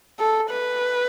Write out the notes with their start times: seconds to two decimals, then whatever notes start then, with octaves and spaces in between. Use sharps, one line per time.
0.19 A4
0.50 B4